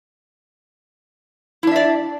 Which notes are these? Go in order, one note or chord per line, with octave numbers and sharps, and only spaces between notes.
D4 E4 D5 E5